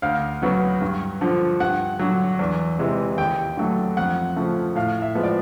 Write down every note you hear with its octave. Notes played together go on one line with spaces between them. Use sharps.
D2 F5
C#3 F#3 B3
G2
D3 F3
G2 F#5
D3 F#3
E2
C3 E3 G#3
D#2 G5
D3 F#3 A3
F2 F#5
C#3 F3 A3
A2 F5
E5
F3 G#3 B3
D5